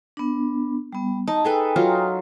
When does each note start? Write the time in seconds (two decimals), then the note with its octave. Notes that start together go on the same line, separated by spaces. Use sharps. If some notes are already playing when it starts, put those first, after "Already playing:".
0.17 B3 D4
0.93 G3 B3
1.27 D#4 D#5 A5
1.45 G#4 A4 B4 G5 G#5
1.76 F#3 D#4 F4